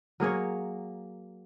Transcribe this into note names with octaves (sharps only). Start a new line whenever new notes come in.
F#3 A#3 G#4 C#5